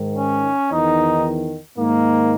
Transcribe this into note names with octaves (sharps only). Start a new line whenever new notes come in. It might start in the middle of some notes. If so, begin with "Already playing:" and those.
Already playing: G#2 D#3
C#4
E2 D#3 D#4
G#2 D#3 A#3